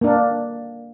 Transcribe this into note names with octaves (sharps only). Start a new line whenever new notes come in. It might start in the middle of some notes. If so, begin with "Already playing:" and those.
A#3 D4